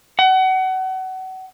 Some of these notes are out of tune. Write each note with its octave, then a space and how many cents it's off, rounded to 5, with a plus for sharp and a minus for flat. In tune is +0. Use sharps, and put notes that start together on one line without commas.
F#5 +30